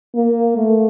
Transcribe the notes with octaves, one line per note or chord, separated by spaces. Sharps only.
A#3
A3